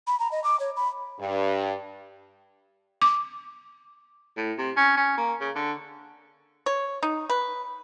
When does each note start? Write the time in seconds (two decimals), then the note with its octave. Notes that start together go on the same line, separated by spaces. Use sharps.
0.07 B5
0.19 A#5
0.31 D#5
0.44 D6
0.60 C#5
0.76 B5
1.20 G2
3.02 D6
4.37 A2
4.58 C3
4.77 C#4
4.97 C#4
5.17 A#3
5.41 C#3
5.56 D3
6.66 C#5
7.03 D#4
7.29 B4